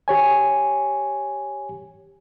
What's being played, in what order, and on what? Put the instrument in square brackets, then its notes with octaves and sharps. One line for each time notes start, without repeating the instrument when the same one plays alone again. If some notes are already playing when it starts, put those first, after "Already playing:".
[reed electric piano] G4 C#5 G#5